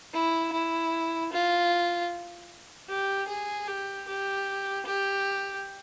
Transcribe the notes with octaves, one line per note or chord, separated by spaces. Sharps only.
E4
E4
F4
G4
G#4
G4
G4
G4